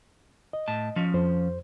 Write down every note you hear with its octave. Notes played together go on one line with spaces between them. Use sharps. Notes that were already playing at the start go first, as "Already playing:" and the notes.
D#5
A2 A5
F3 C#4
F2 C5